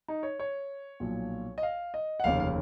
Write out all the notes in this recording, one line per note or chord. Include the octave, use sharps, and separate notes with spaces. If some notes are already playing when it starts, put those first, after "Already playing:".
D#4
C#5
C#5
B1 A#2 F3
D#5
F5
D#5
F#5
F1 D#2 C#3 F5
F5